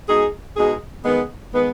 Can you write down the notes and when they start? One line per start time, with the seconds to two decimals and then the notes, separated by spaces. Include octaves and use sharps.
0.08 B2 G#3 D#4 G#4
0.56 B2 G#3 D#4 G#4
1.04 D#3 G#3 B3
1.52 D#3 G#3 B3